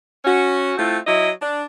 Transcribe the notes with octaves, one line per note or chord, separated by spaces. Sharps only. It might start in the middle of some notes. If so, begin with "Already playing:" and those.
C#4 F#4
A3 C4 E4 F4
F#3 E4 D#5
D4